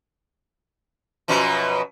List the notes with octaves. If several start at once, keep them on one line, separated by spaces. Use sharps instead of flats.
F#2 B2 F3